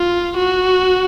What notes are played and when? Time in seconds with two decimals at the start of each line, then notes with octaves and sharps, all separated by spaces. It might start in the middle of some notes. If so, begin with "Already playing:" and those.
Already playing: F4
0.37 F#4